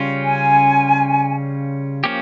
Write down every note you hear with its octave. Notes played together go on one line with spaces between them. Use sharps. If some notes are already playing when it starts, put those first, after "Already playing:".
Already playing: C#3 G3 C#4 F4
G#5
F3 A#3 C#4 G4